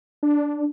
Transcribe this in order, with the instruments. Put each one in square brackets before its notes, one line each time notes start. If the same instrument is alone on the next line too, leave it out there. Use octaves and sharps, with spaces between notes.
[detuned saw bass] D4